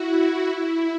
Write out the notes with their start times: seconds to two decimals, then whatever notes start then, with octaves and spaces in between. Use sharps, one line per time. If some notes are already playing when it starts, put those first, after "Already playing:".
Already playing: E4 F#4
0.47 E4